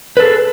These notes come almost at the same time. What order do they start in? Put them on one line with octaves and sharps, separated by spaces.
B4 A4 G#4